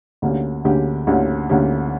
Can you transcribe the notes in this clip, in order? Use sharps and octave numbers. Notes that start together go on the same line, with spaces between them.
D2 D3 A#3 C#4 G4
D2 D3 A#3 C#4 G4
D2 D3 A#3 C#4 G4
D2 D3 A#3 C#4 G4